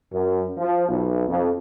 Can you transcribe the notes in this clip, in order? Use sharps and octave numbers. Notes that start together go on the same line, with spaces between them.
F#2
F3
B1
F2